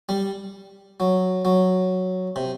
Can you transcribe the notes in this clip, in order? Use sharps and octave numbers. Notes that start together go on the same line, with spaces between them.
G3
F#3
F#3
C3